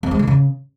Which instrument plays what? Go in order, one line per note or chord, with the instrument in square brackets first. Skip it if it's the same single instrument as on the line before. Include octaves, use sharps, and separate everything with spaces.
[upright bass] F2
G#3
D3
C#3